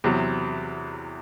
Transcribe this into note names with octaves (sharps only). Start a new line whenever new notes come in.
E2 C3 F#3